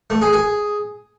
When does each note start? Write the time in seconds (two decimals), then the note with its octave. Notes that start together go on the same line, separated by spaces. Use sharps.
0.10 A3
0.22 G#4
0.33 G#4